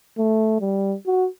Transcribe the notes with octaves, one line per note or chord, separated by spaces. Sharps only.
A3
G3
F#4